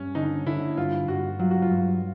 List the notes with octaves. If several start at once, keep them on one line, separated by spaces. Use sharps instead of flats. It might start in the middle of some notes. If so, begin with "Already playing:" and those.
Already playing: G2 C#4
D3 D#4
D3 E4
G2 F4
G2 F#4
F#3 F4
F#4
F4
G2